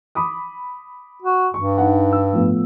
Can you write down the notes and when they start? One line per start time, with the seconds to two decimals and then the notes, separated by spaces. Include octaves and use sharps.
0.15 B5 D6 D#6
1.22 F#4
1.54 G2 C#6
1.78 D#4 F#5
2.12 E6
2.33 A2 F3 B3